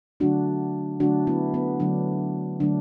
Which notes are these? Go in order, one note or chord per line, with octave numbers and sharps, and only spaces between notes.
D3 F#3 A3 D4 F#4
D3 F#3 A3 D4 F#4
B3 E4
B3
D3 F#3 A3 D4
D3 F#3 A3 D4